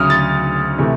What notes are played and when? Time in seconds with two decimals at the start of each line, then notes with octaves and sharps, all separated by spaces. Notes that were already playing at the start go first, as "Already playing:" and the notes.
Already playing: D2 C#3 F#3 D#6 F6
0.10 A6
0.78 C3 E3 A3